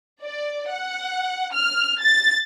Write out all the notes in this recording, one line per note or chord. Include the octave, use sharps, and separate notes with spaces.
D5
F#5
F6
A6